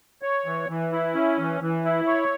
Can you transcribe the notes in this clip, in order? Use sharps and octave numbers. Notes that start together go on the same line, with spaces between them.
C#5
E3
E3
E4
C#4
E3
E3
E4
C#5